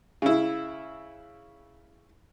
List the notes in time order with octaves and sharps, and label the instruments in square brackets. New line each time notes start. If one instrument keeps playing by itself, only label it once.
[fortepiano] C#3 E4